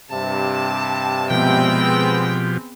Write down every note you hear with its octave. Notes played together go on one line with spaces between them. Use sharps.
G2 C3 A5
B2 F3 G#3 B3 C4 G4 G5